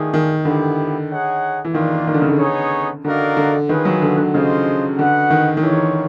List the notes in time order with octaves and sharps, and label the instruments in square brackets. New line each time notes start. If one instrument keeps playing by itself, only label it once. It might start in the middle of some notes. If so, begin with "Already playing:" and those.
Already playing: [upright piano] D#3 [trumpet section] A3 D4 F4 G#4
[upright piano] D#3
[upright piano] D3 [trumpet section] G#3 B3 E4 G4
[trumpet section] D#4 G#4 C#5 F#5
[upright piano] E3
[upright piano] D#3 [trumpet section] A#3 D4 F4
[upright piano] D#3
D3
C#3
D3
[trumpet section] B3 D#4 G#4 C#5
[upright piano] D3 [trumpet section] D#4 F#4 A#4 D5 F5
[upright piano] D3
[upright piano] D#3 [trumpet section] C#4 F4 G#4 B4
[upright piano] F#3
D3
D3
[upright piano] C#3 [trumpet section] F4 G#4 C5 D#5
[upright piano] D3 [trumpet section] F#4 B4 D#5 F#5
[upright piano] D#3
D#3
[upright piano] E3 [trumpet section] F4 A#4 C#5